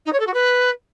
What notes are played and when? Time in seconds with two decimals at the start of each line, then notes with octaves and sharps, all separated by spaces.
0.06 D#4
0.13 C#5
0.20 A4
0.27 F#4
0.34 B4